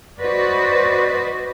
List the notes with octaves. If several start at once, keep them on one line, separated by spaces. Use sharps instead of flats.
F#4 B4 C5 D5 D#5